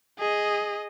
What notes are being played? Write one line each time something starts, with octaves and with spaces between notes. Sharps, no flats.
G#4 D#5